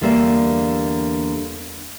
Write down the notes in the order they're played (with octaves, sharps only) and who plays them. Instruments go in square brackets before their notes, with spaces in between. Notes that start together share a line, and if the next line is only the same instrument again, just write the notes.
[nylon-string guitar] E2 D3 G3 A#3 D5 E5